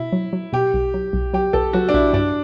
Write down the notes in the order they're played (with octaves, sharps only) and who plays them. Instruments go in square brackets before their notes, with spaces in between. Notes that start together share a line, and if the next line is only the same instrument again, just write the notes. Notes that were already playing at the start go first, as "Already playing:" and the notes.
Already playing: [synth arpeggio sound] B2 [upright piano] E4
[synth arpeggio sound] F#3
F#3
[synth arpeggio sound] B2 [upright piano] G4
[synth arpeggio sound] B1
F#3
B1
[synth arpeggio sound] F#3 [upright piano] G4
[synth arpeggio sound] B1 [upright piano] A4
[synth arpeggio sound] F#3 [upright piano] F#4
[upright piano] D4
[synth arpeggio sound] B1 [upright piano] E4
[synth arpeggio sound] G2 [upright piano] D4